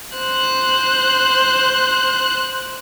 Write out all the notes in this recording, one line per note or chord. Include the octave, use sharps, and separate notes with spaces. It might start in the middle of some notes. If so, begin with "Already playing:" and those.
C5 F#6